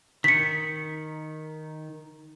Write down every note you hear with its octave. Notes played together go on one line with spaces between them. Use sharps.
D#3 B6 C#7